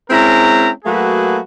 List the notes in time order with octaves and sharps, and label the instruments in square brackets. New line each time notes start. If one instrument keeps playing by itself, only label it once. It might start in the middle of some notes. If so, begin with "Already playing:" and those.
[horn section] G#3 C4 C#4 E4 A#4 A#5
F#3 A3 A#3 F#4 G#4 B4